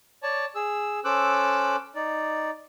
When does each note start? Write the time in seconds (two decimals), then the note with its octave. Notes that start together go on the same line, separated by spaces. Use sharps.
0.23 C#5 D5 A5
0.55 G#4 E6
1.05 C#4 A4 C5 D6 E6 F#6
1.95 D#4 D5